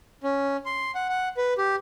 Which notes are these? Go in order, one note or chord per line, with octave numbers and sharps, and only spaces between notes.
C#4
C6
F#5
F#5
B4
G4